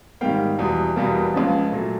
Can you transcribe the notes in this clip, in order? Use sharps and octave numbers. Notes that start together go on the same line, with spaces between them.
G#2 D#3 G3 A#3 F5 G5
E2 B2 G3
E2 B2 G3 A#3
C#2 C#3 F3
A#2 F#3 A3